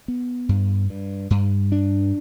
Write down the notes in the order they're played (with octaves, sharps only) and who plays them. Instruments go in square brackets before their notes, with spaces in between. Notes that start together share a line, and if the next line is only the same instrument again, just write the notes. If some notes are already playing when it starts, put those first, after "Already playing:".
[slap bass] B3
G2
G2
G2
D4